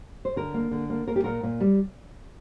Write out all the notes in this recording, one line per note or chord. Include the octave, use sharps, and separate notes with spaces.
C5
D3 A#4
A#3
D3
A#3
A#3 A#4
G4
A#2 A#4
A#2
G3